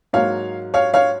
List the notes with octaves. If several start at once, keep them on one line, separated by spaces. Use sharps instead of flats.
G#2 F#3 A#3 C#5 F5
C#5 F5
C#5 F5